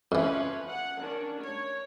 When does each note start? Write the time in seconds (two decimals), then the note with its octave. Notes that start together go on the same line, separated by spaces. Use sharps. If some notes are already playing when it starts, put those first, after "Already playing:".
0.12 F2 E3 F3 C#4 B4
0.67 F#5
0.99 D#3 C#4 D4
1.41 C#5